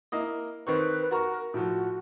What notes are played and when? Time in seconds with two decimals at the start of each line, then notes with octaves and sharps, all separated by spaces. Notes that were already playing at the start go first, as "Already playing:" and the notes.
0.12 A#3 E4 D#5
0.67 D#3 C4 B4 C#6
1.11 F#4 A#4 A#5 C#6
1.54 A2 F3 F#4